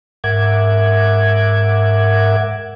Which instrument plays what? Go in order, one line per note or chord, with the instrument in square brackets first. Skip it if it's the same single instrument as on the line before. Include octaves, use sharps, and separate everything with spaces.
[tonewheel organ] G#2 A#4 E5 F#5 D6 G#6